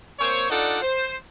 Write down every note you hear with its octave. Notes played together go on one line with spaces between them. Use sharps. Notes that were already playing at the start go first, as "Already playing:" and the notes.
A#3 C4 C5 C#5
D4 D#4 F4 A4 D5 F#5
C5